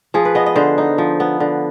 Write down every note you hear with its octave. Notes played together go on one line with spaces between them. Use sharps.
F3 G#4
B4
B3 D#5
D#5
D3 C5
D#4
F3
B3
D3